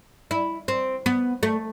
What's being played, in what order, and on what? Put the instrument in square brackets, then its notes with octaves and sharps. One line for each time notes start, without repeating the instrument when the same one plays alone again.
[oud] E4
C4
B3
A3